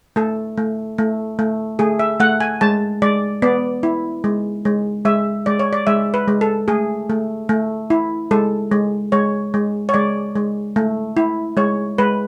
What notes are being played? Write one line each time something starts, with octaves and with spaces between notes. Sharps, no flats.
A3 A4
A3
A3
A3
A3 G#4
E5
A3 F#5
G#5
G#3 A5
G#3 D5
B3 D5
E4
G#3
G#3
G#3 E5
G#3 D5
C#5
D5
G#3 E5
B4
G#3
A4
A3 G#4
A3
A3
E4
G#3 A4
G#3
G#3 C#5
G#3
C#5
G#3 D5
G#3
A3
E4
G#3 C#5
G#3 B4